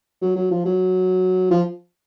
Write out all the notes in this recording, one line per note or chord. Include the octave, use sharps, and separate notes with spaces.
F#3
F#3
F3
F#3
F3